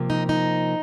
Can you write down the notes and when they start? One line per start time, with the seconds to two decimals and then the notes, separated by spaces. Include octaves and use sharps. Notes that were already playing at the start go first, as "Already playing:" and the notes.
Already playing: C3 F3 A#3
0.10 D#4
0.29 D#4